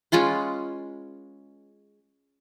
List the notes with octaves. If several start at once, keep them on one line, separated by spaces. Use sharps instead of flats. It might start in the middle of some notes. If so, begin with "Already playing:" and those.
G#3 C#4 F4 B4